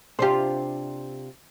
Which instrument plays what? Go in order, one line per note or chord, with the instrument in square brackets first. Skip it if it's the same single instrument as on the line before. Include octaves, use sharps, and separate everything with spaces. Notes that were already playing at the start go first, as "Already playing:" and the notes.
[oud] C3 D4 F4 [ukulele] G4 C5